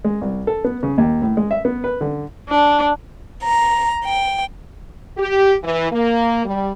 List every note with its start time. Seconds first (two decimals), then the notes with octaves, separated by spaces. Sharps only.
0.04 G#3
0.21 C2
0.47 A4
0.64 B3
0.83 C#3
0.98 D#2
1.22 A2
1.37 G#3
1.51 E5
1.65 B3
1.84 B4
2.01 D3
2.49 D4
3.42 A#5
4.04 G5
5.17 G4
5.63 E3
5.91 A#3
6.45 G3